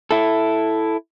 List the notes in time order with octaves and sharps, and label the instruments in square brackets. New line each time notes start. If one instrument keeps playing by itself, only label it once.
[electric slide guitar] E4 A4